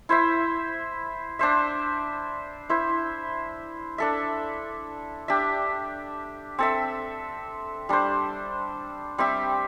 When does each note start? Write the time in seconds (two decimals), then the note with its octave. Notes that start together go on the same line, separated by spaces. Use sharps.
0.09 E4 C5 E5
1.39 D4 C5 E5
2.69 E4 C5 E5
3.98 D4 A4 E5
5.28 D4 G4 E5
6.58 C4 A4 E5
7.89 G3 D4 C5
9.18 G3 C4 G4 E5